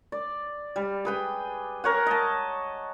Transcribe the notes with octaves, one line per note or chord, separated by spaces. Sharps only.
D5
G3
G#4 B4 G5
A#4 C#5 F#5
D#5 A5